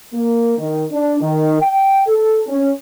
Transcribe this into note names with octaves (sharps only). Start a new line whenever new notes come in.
A#3
D#3
D4
D#3
G5
A4
C#4